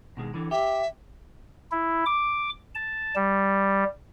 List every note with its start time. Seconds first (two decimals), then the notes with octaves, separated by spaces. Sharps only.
0.17 B2 D#3 G#3
0.34 D3 E3
0.51 G4 E5
1.72 E4
2.06 D6
2.75 A5
3.16 G3